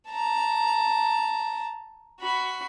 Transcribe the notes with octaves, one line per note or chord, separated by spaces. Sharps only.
A5 A#5
F#4 B5